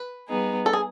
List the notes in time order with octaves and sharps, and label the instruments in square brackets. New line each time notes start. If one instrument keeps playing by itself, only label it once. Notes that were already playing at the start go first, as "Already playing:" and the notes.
Already playing: [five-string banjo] B4
[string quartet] G3 B3 D#4 G#4
[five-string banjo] A4
G#4